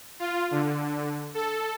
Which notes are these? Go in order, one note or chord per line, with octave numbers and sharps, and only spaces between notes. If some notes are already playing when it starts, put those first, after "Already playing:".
F4
D3
A4